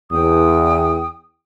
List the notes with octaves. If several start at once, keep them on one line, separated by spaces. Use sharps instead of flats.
E2 G5 D#6